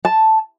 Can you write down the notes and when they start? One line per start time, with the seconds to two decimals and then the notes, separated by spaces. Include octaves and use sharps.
0.05 A5